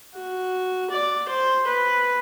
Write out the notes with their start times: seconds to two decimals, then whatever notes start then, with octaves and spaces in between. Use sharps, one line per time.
0.14 F#4
0.90 D5
1.28 C5
1.67 B4